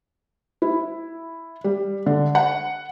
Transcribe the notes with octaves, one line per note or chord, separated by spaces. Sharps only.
E4
G3
D3
F#5